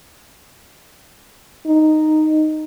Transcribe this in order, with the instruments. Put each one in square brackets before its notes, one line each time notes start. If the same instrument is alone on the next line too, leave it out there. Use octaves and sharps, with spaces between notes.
[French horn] D#4